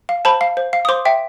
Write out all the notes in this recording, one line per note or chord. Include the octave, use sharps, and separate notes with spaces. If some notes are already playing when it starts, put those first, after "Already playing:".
F5
C5 A5 B5
F5
C5
F5
D#6
C5 C6 D6
E5 G5